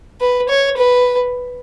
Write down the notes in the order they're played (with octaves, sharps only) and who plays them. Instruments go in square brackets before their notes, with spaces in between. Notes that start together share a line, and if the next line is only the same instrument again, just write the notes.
[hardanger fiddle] B4
C#5
B4